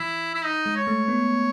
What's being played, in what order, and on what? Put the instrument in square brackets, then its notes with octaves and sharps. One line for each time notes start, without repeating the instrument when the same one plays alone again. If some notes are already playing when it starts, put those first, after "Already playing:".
Already playing: [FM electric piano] E3 [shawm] E4
[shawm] E4
D#4
[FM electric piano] G#3
[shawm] C#5
[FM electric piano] A3
B3